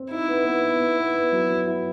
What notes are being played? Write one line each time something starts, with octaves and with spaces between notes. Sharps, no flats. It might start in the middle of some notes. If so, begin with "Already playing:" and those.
Already playing: C4
D#4 E4
B3
B3
B3
B3
B3
B3
F#3
F#3
E4